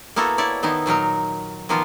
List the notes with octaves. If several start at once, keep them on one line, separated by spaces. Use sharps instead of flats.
A#3 B3 E4 F#4 A4
E4 C#5 D5
D#3 B3 D#4 E4
A#2 F#3 D#4 A#4
D#3 F3 A#3 B3 F4